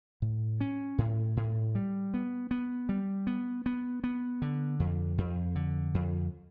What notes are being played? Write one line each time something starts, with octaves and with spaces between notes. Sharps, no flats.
A2
C#4
A2
A2
G3
B3
B3
G3
B3
B3
B3
D3
F2
F2
D3
F2